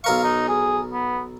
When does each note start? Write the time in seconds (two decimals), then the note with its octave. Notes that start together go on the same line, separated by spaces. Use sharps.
0.04 B1 A#4 F5 C#6
0.24 D#4
0.48 G#4
0.93 B3